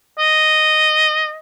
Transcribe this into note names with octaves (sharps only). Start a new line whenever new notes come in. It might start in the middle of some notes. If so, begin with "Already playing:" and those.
D#5